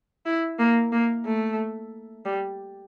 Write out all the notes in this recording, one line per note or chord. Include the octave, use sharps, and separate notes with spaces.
E4
A#3
A#3
A3
G3